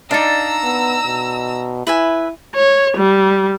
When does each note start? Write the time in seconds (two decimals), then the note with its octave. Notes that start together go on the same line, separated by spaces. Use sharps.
0.11 D4 D#4 D5 F5 A#5 E6
0.64 B3
1.06 B2
1.87 E4 B4 E5 G#5
2.55 C#5
2.97 G3